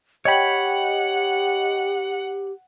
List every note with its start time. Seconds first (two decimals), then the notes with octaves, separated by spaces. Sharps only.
0.25 G4 C#5 D#5 F#5 G5 B5